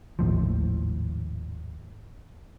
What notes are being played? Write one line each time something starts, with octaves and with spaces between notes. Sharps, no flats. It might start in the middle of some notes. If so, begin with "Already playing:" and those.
G#1 D#2 A2 F3